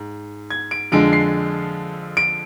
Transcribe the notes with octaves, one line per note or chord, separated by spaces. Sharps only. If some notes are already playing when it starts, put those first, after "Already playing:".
Already playing: G#2
G#6
D7
F2 D3 G#3 D7
C7
D7